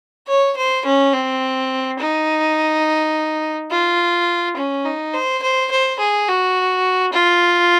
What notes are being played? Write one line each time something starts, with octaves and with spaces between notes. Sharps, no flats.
C#5
C5
C#4
C4
D#4
F4
C#4
D#4
C5
C5
C5
G#4
F#4
F4